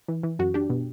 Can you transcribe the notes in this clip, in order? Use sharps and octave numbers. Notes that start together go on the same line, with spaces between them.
E3
E3
F#2 F#4
D4 G4
B2